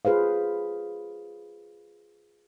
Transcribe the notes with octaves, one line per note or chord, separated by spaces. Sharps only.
F4 G#4 B4 C5 F5